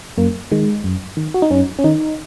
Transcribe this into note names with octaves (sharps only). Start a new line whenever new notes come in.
F#2 A#3
D#3 G#3
F#2
D#3
F#4
D#4
F#2 C#4
C#4
D#3 D#4